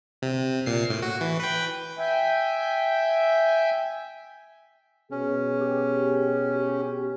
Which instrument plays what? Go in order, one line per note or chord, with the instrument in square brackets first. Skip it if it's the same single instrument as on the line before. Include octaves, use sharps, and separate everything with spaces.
[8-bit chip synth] C3
A#2 C7
A2
F#4
E3
B4 G5
[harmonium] E5 G5 G#5
[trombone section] B2 G#4 [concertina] C#4
[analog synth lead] G4